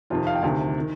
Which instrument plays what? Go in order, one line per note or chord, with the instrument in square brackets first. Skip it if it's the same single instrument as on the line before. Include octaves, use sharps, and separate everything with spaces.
[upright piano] F2 C3 D#3 F4
F5
G5
D2 C3 D#3
D#3